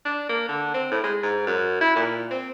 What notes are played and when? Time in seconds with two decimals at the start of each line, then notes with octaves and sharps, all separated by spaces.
0.05 D4
0.29 A#3
0.49 D3
0.74 C4
0.91 A2
1.04 G#3
1.23 G#2
1.47 F#2
1.81 E4
1.96 A#2
2.31 C4